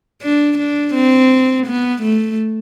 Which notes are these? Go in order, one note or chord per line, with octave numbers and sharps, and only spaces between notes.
D4
D4
C4
B3
A3